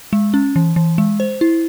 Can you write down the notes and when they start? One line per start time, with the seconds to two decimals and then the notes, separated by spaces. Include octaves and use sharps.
0.13 G#3
0.34 C#4
0.56 E3
0.76 E3
0.98 G#3
1.20 C5
1.41 E4